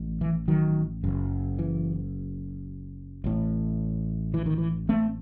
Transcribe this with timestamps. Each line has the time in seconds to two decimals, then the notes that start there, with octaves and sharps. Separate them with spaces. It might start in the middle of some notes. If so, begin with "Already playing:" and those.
Already playing: A1 A2
0.21 E3
0.48 D#3 F#3
1.04 F#1 F#2
1.59 E3
3.24 A1 A2
4.34 E3
4.46 D#3
4.58 E3
4.89 A3 C4